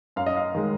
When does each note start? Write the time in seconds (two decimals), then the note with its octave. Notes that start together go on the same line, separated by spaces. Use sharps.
0.16 F#2 F5
0.26 D#5
0.36 F5
0.55 D#3 G#3